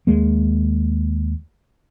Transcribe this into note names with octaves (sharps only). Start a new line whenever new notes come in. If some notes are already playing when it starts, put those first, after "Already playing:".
D#2 G#3 A#3